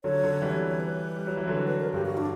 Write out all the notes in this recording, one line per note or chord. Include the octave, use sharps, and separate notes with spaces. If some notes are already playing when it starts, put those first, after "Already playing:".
D3 F#3 C#5
D3 F#3
E3 G3
C#5
B4
G3
F#3
E3
D3 F#3
B4
B4
A#4
G2 G4
F#4
D4